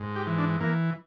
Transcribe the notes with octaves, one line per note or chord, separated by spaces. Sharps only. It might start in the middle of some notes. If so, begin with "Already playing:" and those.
Already playing: G#2
G4
E3
D4
E3 A#3